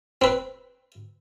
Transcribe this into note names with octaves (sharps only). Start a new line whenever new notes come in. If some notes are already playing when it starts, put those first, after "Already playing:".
C4 B4